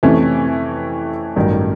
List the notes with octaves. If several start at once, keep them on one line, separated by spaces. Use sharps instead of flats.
F2 C3 E3 A3 C#4
A1 G2 D#3 F#3